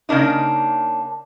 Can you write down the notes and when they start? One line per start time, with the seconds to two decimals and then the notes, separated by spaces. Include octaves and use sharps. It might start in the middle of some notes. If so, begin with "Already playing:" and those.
0.09 C#3 A#3 D4 D#4